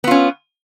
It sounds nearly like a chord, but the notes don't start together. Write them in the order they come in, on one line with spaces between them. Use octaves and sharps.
B3 F4 C#4